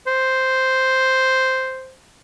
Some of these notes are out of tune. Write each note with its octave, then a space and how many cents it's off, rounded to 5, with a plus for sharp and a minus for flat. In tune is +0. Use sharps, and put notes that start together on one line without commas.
C5 +0